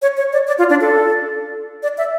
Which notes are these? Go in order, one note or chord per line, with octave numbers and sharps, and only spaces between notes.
C#5
C#5
D5
D5
F4
D4
A4
D5
E5